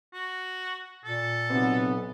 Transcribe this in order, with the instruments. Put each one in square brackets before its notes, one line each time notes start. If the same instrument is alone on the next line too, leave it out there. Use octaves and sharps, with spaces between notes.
[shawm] F#4
[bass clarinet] A#2 [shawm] A4
[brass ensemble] B1 B3 [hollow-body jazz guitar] C3